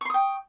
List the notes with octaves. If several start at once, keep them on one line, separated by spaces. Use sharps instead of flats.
G5 C6 C#6 D#6